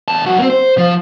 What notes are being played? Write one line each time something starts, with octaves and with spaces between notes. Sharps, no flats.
E2 A5
F#2 F#4
A#3 C4
C5
F3